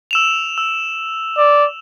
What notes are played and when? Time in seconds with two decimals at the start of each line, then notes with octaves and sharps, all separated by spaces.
0.11 E6 E7 F7
0.58 E6
1.38 D5